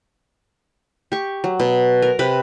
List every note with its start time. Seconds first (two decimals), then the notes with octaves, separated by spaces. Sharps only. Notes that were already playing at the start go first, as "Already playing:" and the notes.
1.12 G4 C#6
1.44 F#3
1.60 B2
2.02 A#4
2.19 C3 B4